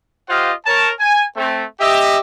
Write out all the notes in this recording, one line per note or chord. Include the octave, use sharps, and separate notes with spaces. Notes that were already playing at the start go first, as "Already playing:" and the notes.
F4 G4 C5 D#5 F5 F#5
A#4 C#5 A5
G#5
A3 C4
G4 D#5 E5